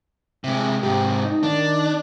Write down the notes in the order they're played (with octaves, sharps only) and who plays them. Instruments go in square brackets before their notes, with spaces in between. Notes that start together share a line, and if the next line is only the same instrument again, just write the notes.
[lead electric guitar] C3 G#3 [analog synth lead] E5
[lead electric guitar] G#2 C3 [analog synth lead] G4
[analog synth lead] D#4
[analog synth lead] D#3 [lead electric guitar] D4